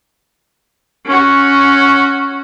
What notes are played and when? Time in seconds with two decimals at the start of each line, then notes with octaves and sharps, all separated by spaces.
1.06 C#4 F#4